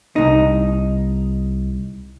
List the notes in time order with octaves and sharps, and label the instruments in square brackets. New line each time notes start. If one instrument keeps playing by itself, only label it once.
[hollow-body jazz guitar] C2 D#4